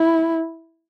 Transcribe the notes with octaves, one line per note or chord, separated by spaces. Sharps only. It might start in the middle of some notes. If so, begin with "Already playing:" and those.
Already playing: E4